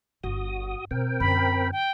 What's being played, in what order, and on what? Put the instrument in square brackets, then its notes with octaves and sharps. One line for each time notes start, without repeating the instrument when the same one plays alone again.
[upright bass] G1 [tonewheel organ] F#4 D#6
[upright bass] B2 [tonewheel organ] C4 A#4 G5
[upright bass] F#2 D3 [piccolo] B5
[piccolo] G5